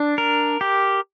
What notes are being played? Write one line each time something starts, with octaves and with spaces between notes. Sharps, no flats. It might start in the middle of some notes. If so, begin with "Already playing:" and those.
Already playing: D4
A#4
G4